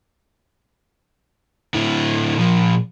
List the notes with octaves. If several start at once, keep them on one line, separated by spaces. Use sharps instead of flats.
A2 D3 E4
A#2 F3